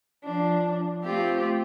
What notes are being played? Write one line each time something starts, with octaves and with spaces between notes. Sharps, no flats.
F3 D4
A3 C4 F4 G4